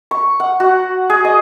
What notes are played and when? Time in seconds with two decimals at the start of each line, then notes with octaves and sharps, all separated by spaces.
0.11 C#6
0.40 F#5
0.60 F#4
1.10 G#4
1.25 D#5